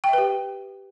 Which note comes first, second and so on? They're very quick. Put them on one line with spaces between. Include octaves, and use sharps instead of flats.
G5 E5 B4 G4